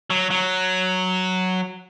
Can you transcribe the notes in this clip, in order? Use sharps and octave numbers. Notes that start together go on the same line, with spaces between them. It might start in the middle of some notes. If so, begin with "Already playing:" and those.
F#3
F#3